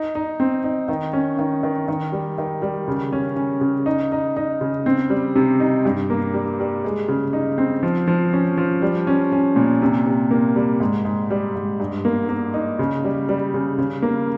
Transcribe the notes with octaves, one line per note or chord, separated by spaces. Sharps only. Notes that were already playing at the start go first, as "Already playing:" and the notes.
Already playing: D#4
D#4
C4
D#4
D#3
C#4
D#3
D#3
D#3
G3
D#3
G3
C#3
C#4
C#4
C#3
D#4
D#4
D#4
C#3
C4
G3
C3
D#4
G2
A#3
G3
G3
G#3
C#3
D#4
C4
F3
F3
C#4
F3
G3
C#4
C#4
A#2
C3
C3
A#3
G3
G#2
G#2
G3
G#2
G2
A#3
A#3
D#4
C#3
G3
G3
C#3
C#3
A#3